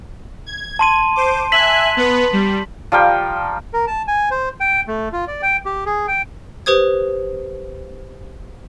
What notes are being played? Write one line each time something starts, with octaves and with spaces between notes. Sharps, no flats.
G#6
A5 C6 D#7
C5 D6
E5 G#5 F#6 B6 F#7
B3 B4
G3
F3 G3 A#4 G5
A#4
A5
G#5
C5
G5
A3
F4
D5
G5
G4
G#4
G5
G4 B4 C5 D#6 G#6